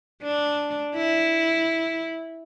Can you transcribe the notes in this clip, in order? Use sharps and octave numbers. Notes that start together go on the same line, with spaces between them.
D4
E4